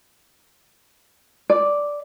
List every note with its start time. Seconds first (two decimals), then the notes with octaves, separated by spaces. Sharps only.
1.50 D5